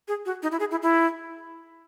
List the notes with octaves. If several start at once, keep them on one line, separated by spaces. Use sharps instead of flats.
G#4
F#4
D#4
E4
G#4
E4
E4